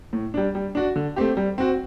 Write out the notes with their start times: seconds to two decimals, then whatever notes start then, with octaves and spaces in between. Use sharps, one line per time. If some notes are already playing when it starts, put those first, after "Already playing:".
0.13 A2
0.34 G3 D4
0.55 G3
0.75 D4 F#4
0.96 D3
1.16 A3 C4 G4
1.37 G3
1.58 C4 F#4